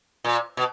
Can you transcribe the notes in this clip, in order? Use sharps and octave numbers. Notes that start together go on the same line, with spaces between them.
A#2
B2